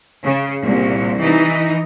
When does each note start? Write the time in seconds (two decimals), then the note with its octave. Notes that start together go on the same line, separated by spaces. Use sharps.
0.24 C#3
0.62 C2 A#2
1.20 E3 D#4